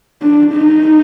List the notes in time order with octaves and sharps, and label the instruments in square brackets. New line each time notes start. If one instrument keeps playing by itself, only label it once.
[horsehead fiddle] D4
D#4